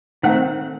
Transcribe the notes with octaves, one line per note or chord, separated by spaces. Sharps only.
D#3 A3 C4 F#5